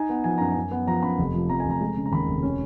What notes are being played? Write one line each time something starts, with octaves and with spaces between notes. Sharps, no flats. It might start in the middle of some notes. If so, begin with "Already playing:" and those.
Already playing: D#4 G#5
B3
F3 G#5
F#2 A#5
F#2 G#5
B3
F3 A#5
F#2 B5
F1
F3
F2 A#5
G#5
F1 A#5
G#3
C#3
A#5
D#2 B5
F1
C#4